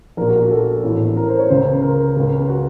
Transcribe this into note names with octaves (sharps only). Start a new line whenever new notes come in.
A#1 A#2 A#4
F#4
F#4
A4
A1 A2
A#4
C5
C#5
C#2 C#3 C5
A#4
C#2 C#3
F#4